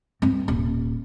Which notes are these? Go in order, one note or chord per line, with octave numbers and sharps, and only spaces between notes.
G2 C4
D#1